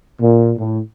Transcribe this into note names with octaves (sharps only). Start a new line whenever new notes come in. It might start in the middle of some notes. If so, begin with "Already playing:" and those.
A#2
A2